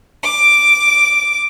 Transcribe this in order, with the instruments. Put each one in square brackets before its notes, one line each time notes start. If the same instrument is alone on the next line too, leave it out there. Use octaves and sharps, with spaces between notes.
[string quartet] D6